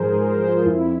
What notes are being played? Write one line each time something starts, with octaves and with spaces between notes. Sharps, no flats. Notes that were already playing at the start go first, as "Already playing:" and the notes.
Already playing: G#2 F3 G#4 A#4 C5
G#2 A#4
A#4
C5
F3
F4
F2 E4